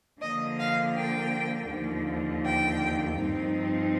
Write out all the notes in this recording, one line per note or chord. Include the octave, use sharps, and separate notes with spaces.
D3 F3 A#3 D#5
F5
G5
D#2 D3 F3
G5
G2 F3 C4 D#4